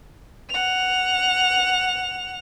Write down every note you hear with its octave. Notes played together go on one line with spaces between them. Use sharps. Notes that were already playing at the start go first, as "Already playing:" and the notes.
F#5 F7